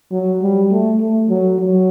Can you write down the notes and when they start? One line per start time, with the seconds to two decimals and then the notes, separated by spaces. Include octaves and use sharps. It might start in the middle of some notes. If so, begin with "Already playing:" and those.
0.12 F#3
0.42 G3
0.71 A3
1.01 A3
1.29 F#3
1.59 F#3